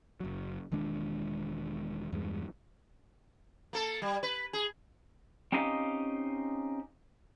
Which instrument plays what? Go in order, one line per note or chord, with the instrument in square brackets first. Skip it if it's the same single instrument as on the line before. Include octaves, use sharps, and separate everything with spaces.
[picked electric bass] F#1 F#3
E1 D#3 G#3 D4
E2 G2 G#3
[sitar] A#3 A4
G3
B4
G#4
[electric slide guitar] C4 C#4 D#4 G4 D#5 F5